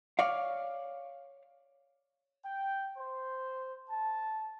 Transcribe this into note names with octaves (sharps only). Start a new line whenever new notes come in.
C#5 D5 F5
G5
C5
A5